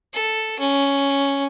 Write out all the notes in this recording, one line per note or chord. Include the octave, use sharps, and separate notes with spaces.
A4
C#4